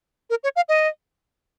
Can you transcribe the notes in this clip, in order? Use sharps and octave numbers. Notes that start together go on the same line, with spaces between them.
A#4
C#5
F5
D#5